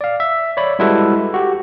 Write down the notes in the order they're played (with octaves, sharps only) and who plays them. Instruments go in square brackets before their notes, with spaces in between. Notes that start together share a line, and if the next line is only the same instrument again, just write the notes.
[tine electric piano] D5 F5
E5
C#5 D5 B5
G3 G#3 E4 F#4 A4 B4
F#4 G4